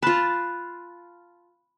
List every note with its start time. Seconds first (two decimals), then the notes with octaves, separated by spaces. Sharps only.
0.02 F4 A5 B5 F#6